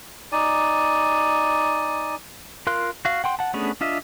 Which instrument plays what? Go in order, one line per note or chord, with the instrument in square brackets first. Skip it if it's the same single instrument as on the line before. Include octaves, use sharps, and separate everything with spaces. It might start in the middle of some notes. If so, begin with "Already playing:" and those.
[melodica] D#4 D5 G#5
[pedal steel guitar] F4 A#4 F5 C6 F#6
F#4 F5
F#5 G5 C6
F#5 A5
A3 B3 C#4 D4 G#4
D4 F4 D#5 E5